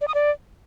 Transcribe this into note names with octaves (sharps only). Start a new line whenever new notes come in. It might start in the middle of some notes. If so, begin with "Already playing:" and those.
D5
D#6
D5